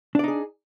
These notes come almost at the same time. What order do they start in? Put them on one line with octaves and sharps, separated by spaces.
D4 D5 D#4 G#4